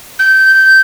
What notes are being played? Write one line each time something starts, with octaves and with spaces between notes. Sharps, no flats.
G6